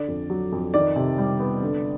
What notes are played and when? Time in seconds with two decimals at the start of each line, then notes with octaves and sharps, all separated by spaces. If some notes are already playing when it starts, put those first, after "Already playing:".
Already playing: D3 D5
0.08 F2
0.30 F#3
0.52 F2
0.74 D#3 D5
0.96 C3
1.18 G3
1.40 B3
1.62 D3